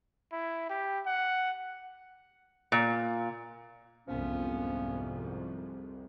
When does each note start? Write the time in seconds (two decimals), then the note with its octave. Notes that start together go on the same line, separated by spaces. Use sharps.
0.32 E4
0.69 G4
1.06 F#5
2.72 A#2
4.08 C2 F2 G#2 F3 B3 C#4